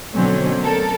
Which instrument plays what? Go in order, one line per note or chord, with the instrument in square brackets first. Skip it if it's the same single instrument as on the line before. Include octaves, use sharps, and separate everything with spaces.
[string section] B2 D3 F#3 A3 C4 C#4
A4 A#4